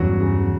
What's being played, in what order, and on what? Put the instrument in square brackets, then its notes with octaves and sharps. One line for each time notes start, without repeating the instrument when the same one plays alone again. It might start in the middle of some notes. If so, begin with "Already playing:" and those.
Already playing: [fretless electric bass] E2 G2 [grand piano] C#3 F#3 C#4 F#4
[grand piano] C#3